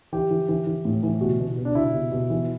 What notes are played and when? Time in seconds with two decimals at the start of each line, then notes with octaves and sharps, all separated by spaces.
0.13 E3 G4
0.31 E3
0.49 E3
0.67 E3
0.85 A2
1.03 E3
1.21 B2 F#4
1.40 B2
1.57 B2
1.65 D4
1.75 B2 E4
1.93 B2
2.12 B2
2.30 E3